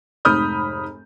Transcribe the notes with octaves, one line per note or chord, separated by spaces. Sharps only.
F1 G#2 B5 D#6 F6 G6